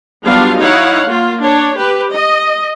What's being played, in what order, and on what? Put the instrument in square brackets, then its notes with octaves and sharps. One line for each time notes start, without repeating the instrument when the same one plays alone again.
[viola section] F#3 G3 B3 D4 F4 F5
D#4 E4 C#5 F5 F#5
A#3 F4
D4 C#5
G4 B4
D#5